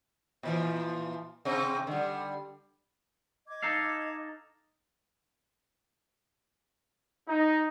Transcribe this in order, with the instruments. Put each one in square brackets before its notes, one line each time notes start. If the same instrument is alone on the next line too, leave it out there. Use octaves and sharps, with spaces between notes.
[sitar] A#2 E3 F3
C3 C4
D3 G3
[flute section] D#5 D6 G#6
[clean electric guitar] D#4 A4 F5
[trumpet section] D#4